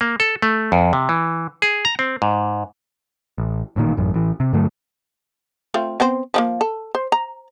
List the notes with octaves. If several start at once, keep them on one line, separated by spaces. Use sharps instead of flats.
A#3
A4
A3
F2
C3
E3
G#4
A#5
C4
G#2
A1
A1 G2 A#2 D#3
A1 F#2
A1 E3
C3
G2 D3 F#3 A3
A3 C4 F4
B3 C4 C5
F3 F#3 A#3
A4
C5
A#5